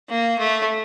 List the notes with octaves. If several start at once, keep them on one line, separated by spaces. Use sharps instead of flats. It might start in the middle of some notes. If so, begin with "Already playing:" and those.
A#3
A3